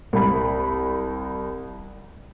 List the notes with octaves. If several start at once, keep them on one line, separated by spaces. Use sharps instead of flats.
C2 B5